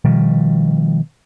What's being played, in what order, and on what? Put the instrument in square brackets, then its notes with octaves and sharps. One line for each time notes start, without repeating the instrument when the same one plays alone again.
[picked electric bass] B2 D#3 F3 G3